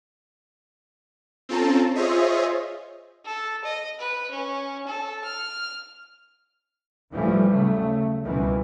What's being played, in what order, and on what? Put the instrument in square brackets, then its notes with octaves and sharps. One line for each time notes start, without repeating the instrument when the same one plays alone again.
[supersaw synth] C4 C#4 F4 A4 A5 A#5
F4 G#4 C5 C#5 D#5 E5
[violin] A4
D#5
B4
C#4
A4
F6
[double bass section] D#2 A2 E3 F3 G3 A3
C#3 F#3 A3
C#2 B2 D#3 E3 G3